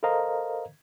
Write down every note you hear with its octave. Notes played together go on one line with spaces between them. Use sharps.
A4 A#4 C5 D#5 F5 A#5